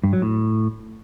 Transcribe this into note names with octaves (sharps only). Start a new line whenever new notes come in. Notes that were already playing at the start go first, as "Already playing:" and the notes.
G2
F#3
A2